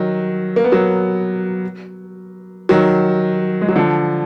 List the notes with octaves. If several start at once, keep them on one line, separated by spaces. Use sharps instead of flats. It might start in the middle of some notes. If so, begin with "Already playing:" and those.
Already playing: D#3 F#3
A#3
B3
F#3 A#3
D#3 F#3
G#3
F#3
D3 F3